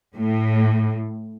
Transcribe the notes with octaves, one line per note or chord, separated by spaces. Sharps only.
A2